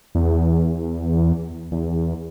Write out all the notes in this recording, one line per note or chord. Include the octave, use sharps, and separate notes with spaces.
E2
E2